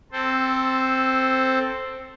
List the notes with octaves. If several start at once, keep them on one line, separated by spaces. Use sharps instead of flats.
C4 A4 C5